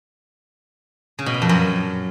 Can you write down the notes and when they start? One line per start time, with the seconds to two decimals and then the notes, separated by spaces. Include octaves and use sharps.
1.19 C#3
1.26 B2
1.34 A#2
1.42 F2
1.49 F#2